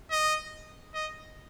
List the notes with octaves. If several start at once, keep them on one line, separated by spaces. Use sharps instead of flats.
D#5
D#5